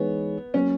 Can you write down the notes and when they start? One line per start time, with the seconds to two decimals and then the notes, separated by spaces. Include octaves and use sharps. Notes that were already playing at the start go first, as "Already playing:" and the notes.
Already playing: E3 G#3 B3 D#4 G#4 C#5
0.54 F#3 A#3 C#4